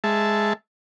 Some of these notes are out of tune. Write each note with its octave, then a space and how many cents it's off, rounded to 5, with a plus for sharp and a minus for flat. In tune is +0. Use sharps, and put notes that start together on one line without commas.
G#3 +0 E5 +0 A5 +0